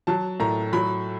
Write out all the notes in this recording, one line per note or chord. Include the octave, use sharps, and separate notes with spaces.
F#3 A5
A2 A#5
F#3 B5